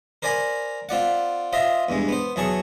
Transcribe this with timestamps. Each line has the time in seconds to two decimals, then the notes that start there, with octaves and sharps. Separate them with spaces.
0.22 A#4 C5 D5 G#5 A#5 B5
0.89 C4 F4 D5 F#5
1.53 F4 C5 D#5 E5
1.89 E2 G2 G#3
2.08 B3 C5
2.36 E2 F#3 G#4 A5 C#6